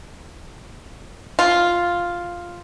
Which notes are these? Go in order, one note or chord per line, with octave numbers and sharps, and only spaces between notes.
F4